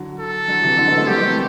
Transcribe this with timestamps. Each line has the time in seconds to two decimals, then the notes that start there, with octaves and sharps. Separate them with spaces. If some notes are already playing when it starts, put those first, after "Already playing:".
Already playing: D3 F#3
0.19 A4
0.48 D3 F#3
0.63 C3 E3
0.78 D3 F#3
0.87 B3 D4
0.98 A3 C4
1.07 G3 B3 G4
1.22 A3 C4